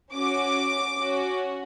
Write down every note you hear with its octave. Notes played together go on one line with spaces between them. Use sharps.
C#4 F#4 D6
C#4 F#4